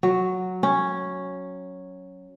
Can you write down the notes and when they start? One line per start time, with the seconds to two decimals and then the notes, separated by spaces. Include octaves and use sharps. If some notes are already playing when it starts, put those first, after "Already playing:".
0.03 F#3
0.63 C#4